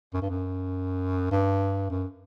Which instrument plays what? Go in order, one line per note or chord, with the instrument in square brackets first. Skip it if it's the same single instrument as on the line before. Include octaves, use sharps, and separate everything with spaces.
[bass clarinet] F#2
G2
F#2
G2
F#2